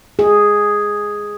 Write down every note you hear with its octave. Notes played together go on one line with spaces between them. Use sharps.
G#4